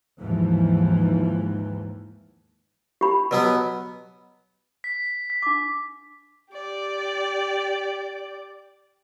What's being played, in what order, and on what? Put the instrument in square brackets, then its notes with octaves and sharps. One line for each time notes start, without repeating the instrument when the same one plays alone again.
[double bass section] D#2 G#2 E3 F3
[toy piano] G4 B5
[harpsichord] B2 F#3 B3
[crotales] B6
B6
[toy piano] D4 D6
[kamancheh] G4 D5